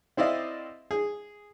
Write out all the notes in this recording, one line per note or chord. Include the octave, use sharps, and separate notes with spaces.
C4 E4 D5 D#5 F5
G#4